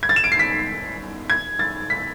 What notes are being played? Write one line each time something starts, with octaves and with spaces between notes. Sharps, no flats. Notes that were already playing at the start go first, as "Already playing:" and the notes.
G#6
A6
E7
D7
C7
B6
G#6
A6
B6